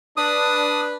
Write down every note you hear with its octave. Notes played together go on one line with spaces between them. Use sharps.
D4 B4 D#6